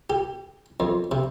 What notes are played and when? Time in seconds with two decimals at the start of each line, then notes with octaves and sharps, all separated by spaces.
0.10 G4
0.80 F2
1.12 C3